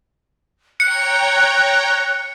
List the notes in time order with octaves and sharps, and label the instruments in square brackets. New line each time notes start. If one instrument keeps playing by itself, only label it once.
[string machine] C#5 G5 A#5 [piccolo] F#6 [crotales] C#7